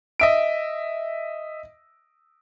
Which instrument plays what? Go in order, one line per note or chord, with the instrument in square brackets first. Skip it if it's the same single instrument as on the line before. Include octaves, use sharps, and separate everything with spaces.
[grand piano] D#5 E5 D7